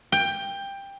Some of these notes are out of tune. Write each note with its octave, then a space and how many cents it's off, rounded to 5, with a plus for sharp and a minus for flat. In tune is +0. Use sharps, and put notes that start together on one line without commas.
G5 +15